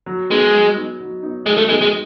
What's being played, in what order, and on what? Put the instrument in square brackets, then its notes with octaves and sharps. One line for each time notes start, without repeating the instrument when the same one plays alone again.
[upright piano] F#3
[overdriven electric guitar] G#3 [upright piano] B3 D#4
[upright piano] F#3
B3 D#4
F#3
B3 D#4
[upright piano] F#3 [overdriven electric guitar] G#3
[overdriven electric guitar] A3
[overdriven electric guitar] G#3 [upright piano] B3 D#4
[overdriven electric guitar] G#3